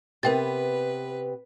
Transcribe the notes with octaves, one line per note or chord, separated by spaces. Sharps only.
C3 B3 A#4 B4 G5 A6